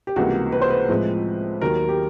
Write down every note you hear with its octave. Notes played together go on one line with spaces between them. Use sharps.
G4
C#2 C3 E3 G3 A#3 F#4
B4
C5
B4
A2 F3 G#3 C4
D#2 D#3 F#3 A#4
G4